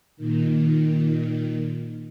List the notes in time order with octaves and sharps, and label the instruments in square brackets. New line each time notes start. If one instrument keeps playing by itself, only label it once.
[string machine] A#2 D#3